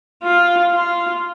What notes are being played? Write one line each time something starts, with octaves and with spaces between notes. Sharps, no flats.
F4
F4